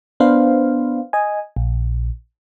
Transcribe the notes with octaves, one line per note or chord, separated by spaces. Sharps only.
B3 D4 B4 C5 F5
D#5 G#5
A#1